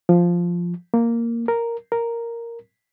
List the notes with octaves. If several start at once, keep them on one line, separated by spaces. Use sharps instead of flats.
F3
A#3
A#4
A#4